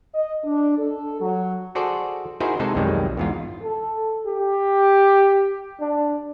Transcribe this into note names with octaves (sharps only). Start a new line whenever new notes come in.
D#5
D4
A4
F#3
F#4 G#4 A4 C5 D5
D#4 E4 F#4 G#4 A#4 C5
C3 G#3 D#4 A4 C5
B1 F2 B2 D#3 G3 G#3
E2 G#2 F4
A4
G4
D4